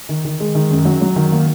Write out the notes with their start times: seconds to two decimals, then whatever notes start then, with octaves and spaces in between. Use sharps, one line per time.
0.09 D#3
0.25 D#3
0.40 G#3
0.55 D#3
0.71 F#2
0.85 F#3
1.02 F#3
1.16 D#3
1.32 A#3